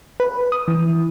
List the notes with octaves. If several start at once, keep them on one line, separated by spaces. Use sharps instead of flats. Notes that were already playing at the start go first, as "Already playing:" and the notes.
B4
D#6
E3